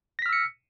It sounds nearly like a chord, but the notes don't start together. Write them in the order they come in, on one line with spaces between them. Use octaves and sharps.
A#6 B6 F6 E6 C#7